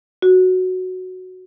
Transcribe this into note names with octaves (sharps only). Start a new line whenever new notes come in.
F#4